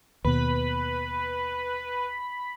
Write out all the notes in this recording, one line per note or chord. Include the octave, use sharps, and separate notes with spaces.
D#2 B2 B4 B5